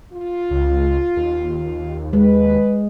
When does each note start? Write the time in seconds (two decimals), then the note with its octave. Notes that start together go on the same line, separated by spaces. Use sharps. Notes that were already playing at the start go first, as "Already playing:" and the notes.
0.13 F4
0.50 C#2
1.16 D#2
2.13 G#3 B4